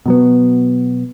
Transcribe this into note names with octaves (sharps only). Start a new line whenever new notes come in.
B2 F#3 B3